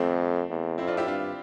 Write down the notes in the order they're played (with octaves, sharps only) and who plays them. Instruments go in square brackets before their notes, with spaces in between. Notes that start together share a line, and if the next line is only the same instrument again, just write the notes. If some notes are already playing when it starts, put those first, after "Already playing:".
Already playing: [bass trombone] F2 [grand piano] A3 C4
[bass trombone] E2
[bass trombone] F2 [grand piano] C4 E4
[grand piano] D4 F4
E4 G4
[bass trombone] G2 [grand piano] D4 F4